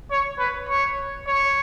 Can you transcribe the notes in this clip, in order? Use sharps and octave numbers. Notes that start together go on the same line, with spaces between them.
C#5
B4
C#5
C#5